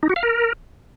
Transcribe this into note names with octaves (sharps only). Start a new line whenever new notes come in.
D#4
F#4
F5
A#4